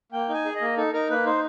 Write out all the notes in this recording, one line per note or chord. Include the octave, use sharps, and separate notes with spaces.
A#3 G5
D#4
G#5
G#4
D#5
A#3
D#4 A4
D#4 A#4
A#3 B4
D#4 C5